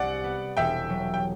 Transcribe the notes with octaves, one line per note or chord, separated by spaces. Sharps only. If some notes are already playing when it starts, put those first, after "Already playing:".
Already playing: C2 D5 F#5
B3
E1 E5 G5
F#3
G5